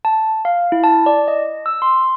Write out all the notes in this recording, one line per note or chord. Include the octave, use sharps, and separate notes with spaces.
A5
F5
E4
A5
D5
D#5
E6
C6